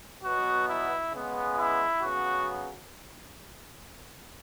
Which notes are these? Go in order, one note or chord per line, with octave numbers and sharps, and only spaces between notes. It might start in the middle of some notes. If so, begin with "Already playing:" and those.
B2 F#3 B3 F#4
E4
C#3 G#3 B3
E4
C#3 F#3 B3 F#4